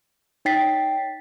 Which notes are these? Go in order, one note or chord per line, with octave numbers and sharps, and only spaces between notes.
D#4 C#5 G5 A6 B6 C7